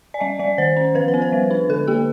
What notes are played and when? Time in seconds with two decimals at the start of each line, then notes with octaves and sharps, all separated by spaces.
0.14 D5
0.20 G3 D#5
0.39 G3 D5
0.58 D#3 C5
0.77 C#4
0.94 F3 B4
1.08 C5
1.14 B3
1.22 B4
1.32 G3
1.51 D4
1.69 D3 A4
1.87 A#3 G4